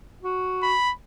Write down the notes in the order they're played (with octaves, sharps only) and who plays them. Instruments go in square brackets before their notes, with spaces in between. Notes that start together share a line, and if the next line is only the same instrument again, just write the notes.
[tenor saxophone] F#4
[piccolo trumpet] B5